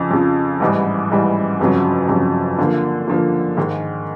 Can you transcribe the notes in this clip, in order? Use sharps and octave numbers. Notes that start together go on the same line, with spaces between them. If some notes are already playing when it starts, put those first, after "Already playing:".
Already playing: F2 C#3 F3
F2 C#3 F3
A1 G#2 E3 G3
A1 G#2 E3 G3
G1 F2 C#3 F#3
G1 F2 C#3 F#3
D3 F3 A#3
D3 F3 A#3
G#2 D#3 G#3